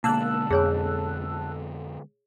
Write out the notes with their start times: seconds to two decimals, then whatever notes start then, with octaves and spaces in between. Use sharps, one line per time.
0.04 B2 D3 G#3 A#3 A5 E6 F#6
0.50 F2 G#4 C#5 G#5